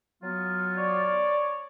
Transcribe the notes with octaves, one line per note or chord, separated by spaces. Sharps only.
F#3 B3 F4
C#5 D5